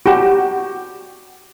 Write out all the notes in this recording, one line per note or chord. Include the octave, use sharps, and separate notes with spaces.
F#4 G4